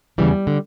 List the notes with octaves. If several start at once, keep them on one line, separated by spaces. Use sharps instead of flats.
E2 C#3 E3 G3
D3